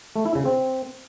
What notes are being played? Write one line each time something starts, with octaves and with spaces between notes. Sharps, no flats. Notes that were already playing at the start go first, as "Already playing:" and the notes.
A3
E4
C#3
C4